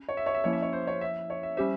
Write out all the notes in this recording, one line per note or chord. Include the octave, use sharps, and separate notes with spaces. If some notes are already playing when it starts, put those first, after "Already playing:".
Already playing: C#4
C#5
E5
C#5
E5
F3 A#3 C#4 E4 C#5
E5
C#5
C5
C#5
E5
C#5
E5
G3 C#4 G4 C5 E5